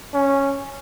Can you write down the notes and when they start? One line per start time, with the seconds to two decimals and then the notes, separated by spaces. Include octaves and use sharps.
0.14 C#4